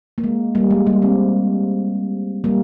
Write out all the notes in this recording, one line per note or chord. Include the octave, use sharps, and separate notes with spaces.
A#3
G#3
G3 A#3
G#3
G3 A#3
G#3 C4
G3 A#3